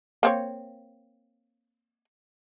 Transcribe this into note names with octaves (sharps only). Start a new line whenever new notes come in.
A#3 C4 C#5